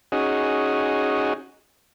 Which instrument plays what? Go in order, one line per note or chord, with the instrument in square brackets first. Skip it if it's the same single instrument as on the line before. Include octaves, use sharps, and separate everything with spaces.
[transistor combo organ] C#4 D#4 F#4 G#4